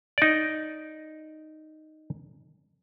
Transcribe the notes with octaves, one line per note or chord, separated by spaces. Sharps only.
D#4 D5